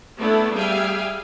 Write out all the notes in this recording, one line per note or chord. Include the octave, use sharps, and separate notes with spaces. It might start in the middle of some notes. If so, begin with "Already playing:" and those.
A3 B3 D4 E4 A4
G3 G#4 E5 F5 G5 G#5